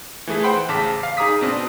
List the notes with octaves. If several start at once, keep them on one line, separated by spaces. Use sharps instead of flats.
E3 A3 E4 G#4 B4
C5 F#5 G5 B5 C6
A1 C#3 A5 D6 B6
F5
D#4 G#4 A#5 D6 D#6 B6
B2 C4 D4